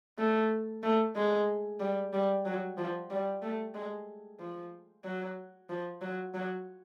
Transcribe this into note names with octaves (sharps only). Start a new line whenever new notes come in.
A3
A3
G#3
G3
G3
F#3
F3
G3
A3
G#3
F3
F#3
F3
F#3
F#3